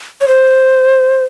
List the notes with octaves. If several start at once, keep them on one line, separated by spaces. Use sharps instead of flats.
C#5
C5